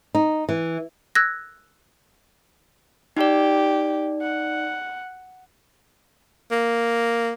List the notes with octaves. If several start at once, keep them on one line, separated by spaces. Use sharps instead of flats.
D#4
E3
E6 F#6 G#6 A#6
D#4 G4 D5
F#5
A#3